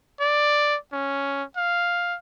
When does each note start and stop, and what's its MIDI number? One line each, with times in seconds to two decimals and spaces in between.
0.20 0.77 74
0.93 1.43 61
1.56 2.16 77